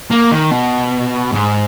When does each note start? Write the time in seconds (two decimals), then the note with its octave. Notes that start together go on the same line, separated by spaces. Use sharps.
0.10 A#3
0.31 D#3
0.51 B2
1.32 G#2